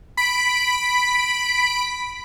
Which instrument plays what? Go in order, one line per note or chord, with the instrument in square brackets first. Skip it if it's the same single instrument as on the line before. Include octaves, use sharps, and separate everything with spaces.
[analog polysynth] B5 B6 D7